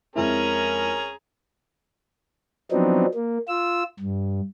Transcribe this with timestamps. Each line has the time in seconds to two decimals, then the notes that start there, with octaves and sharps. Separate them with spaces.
0.16 F2 G#3 C#4 E4 G#4 A#4 A#5
2.72 F3 F#3 B3 C4 D4 D#4
3.14 A#3
3.48 F4 E6
4.00 G2